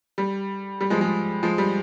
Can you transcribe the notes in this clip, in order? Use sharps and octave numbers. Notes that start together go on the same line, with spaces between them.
G3
G3
F3 G#3
F3 G#3
F3 G#3
G3